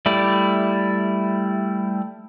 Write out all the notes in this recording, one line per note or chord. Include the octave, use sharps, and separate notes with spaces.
G3 A3 E4 D5